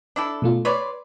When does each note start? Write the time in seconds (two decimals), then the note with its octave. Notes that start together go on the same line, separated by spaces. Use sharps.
0.16 D4 E4 A4
0.42 B2 A3 F4
0.65 B4 C#5 D5 C6